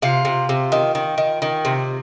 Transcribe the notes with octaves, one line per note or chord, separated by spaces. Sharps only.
C3 F4
C3
C3
D#3
D#3
D#3
D#3
C3